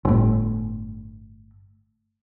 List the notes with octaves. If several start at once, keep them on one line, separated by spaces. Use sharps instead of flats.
G1 A2